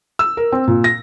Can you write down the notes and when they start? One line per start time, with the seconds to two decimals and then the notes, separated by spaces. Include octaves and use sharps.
0.19 E6
0.37 A#4
0.52 C4
0.68 A#2
0.84 A#6